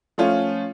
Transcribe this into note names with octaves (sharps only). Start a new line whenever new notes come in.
F3 A3 C#4 F4